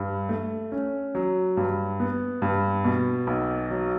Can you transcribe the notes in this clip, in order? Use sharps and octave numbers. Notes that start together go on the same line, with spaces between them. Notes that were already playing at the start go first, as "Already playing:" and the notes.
Already playing: G2
A3
C#4
F#3
G2
B3
G2
B2
B1
F#3